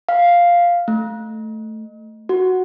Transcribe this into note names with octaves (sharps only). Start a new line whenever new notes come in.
F5
A3
F#4